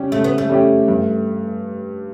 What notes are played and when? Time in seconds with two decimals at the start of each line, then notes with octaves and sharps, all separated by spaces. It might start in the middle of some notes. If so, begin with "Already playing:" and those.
Already playing: C#3 G3 C#4 G4
0.12 C#3 A3
0.24 B3
0.38 A3
0.49 G3 C#4 G4
0.88 G2